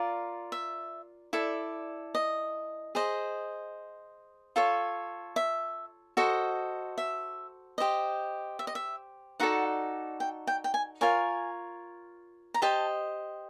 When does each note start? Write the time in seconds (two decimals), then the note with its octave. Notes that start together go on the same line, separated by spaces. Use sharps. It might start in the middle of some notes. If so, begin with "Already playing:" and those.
Already playing: F4 A#4 D5
0.52 E5
1.33 E4 A4 D5
2.15 D#5
2.95 G#4 C5 D#5
4.56 F4 A4 C#5
5.36 E5
6.17 F#4 A4 C5 D#5
6.98 E5
7.78 G4 C5 D#5
8.59 E5
8.67 D#5
8.75 E5
9.40 D#4 F#4 A4 D5 F#5
10.20 G5
10.47 G5
10.64 G5
10.74 G#5
11.01 F4 A#4 C#5 G#5
12.54 A#5
12.62 G4 C5 D#5 A5